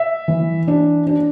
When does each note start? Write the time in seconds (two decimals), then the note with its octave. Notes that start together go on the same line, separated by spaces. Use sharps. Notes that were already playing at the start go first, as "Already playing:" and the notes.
Already playing: E5
0.28 E3
0.68 D4
1.07 D4